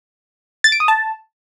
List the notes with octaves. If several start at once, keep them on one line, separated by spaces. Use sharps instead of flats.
A6
D7
D#6
A5